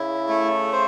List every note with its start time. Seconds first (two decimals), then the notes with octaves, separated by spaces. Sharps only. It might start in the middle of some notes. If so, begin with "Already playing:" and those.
Already playing: C#3 E4
0.29 A3
0.73 C5